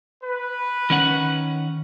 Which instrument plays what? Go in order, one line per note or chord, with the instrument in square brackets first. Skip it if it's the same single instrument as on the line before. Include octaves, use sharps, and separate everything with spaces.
[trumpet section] B4
[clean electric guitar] D#3 C#4 F#5